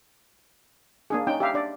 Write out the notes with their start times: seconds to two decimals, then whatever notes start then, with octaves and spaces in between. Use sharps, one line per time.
1.10 A#3 D4 G#4
1.27 C#4 D#4 G5
1.40 G4 E5 F5
1.54 D4 D5